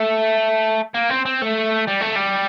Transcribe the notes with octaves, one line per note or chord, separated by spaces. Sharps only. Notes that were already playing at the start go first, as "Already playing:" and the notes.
Already playing: A3
A#3
C4
C4
A3
G3
A3
G3